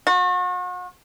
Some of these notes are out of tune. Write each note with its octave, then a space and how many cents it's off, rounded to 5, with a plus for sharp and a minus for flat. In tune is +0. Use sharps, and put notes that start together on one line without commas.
F#4 -40